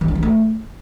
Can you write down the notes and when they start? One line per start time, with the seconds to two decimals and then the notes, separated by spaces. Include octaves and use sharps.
0.01 E3
0.08 D4
0.15 E3
0.23 A3